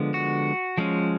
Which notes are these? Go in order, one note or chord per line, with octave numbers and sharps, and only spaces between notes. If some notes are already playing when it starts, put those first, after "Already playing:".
Already playing: D3 F3 G#3 B3
F#4
F3 G#3 C#4